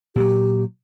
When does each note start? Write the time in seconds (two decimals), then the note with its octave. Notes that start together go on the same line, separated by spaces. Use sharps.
0.16 A#2 F#3 G4